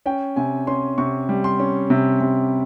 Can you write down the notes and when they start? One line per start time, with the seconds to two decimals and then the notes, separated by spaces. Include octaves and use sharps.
0.06 C#4 G5
0.36 C3 G#5
0.67 C#4 C6
0.98 C3 C#6
1.29 G3
1.44 C6
1.59 C#4
1.90 C3
2.21 C3